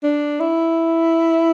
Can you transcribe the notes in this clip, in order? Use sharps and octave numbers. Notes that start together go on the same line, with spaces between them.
D4
E4